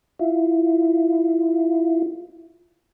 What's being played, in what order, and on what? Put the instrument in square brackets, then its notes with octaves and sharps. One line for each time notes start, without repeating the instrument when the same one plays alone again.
[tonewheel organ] E4 F4